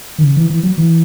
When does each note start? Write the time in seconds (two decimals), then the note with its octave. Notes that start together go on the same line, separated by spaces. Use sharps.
0.18 D#3
0.23 C#3
0.37 E3
0.50 E3
0.63 F#3
0.78 E3